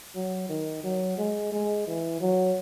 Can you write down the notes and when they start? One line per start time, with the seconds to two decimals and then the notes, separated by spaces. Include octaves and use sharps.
0.15 F#3
0.49 D#3
0.84 F#3
1.18 G#3
1.52 G#3
1.87 E3
2.21 F#3